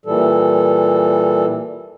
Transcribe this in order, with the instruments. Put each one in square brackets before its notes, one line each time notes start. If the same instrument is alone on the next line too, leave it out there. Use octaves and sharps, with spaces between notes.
[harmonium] A#2 E3 G3 A4